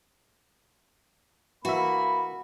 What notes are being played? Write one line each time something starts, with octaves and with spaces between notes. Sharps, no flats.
E3 A#3 F#4 E5 B5